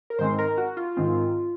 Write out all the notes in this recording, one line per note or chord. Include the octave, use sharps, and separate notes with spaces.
A#4
G#2 D#3 G#3 C4 C5
A#4
F#4
F4
G#2 D#3 G#3 C4